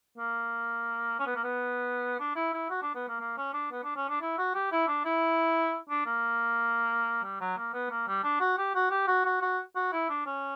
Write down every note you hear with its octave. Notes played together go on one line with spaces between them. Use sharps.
A#3
C#4
B3
A#3
B3
D4
E4
E4
F#4
D4
B3
A#3
A#3
C#4
D4
B3
D4
C#4
D4
E4
F#4
G4
E4
D4
E4
D4
A#3
G3
F#3
A#3
B3
A#3
G3
D4
F#4
G4
F#4
G4
F#4
F#4
F#4
F#4
E4
D4
C#4